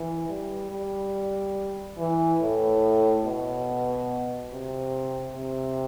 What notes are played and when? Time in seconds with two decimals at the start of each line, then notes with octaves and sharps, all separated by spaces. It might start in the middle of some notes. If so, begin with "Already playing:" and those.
Already playing: E3
0.29 G3
0.71 G3
1.98 E3
2.41 A2
3.25 B2
4.51 C3
5.35 C3